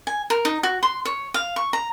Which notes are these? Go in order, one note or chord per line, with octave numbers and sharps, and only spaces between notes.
G#5
A#4
D#4
F#4
C6
C#5
F5
C#6
A#5